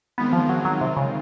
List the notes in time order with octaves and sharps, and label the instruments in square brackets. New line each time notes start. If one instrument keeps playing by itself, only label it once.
[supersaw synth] D#3 G#3 C4 F4 [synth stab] B3
[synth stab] F3
F#3
F#3
C3
C#3